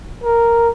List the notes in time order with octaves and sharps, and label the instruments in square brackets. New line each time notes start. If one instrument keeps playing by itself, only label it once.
[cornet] A#4